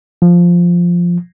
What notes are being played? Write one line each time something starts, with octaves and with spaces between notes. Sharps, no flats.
F3